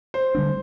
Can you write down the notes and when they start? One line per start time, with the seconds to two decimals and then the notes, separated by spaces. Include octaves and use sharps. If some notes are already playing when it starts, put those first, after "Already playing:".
0.14 C5
0.35 D3 G3 A#3 D4